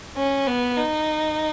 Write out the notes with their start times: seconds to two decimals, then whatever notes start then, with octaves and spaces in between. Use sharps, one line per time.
0.17 C#4
0.47 B3
0.77 D#4